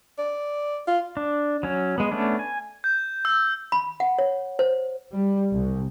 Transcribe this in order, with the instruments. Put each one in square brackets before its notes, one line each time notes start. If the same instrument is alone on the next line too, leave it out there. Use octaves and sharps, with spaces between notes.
[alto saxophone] D5
F4
[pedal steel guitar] D4
F#3 C#4
G#3 B3
A3 B3 C#4 D4
G#5
[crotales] G6
E6
[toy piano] B5
F#5
C#5
C5
[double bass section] G3
C2